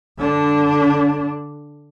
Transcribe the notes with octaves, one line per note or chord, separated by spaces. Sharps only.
D3 D4